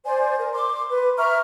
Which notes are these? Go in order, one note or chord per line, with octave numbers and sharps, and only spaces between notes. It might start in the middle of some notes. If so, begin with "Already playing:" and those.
C5 D5 G#5
A#4
C6 D6
B4
E5 A#5 C#6 F6